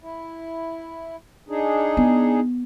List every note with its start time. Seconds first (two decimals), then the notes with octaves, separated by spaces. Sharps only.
0.01 E4
1.49 D4 D#4 G#4
1.97 B3